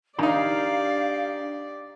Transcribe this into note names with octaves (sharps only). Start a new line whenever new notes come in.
D#3 D4 D#4 G4 D5 F5 G#5 A#5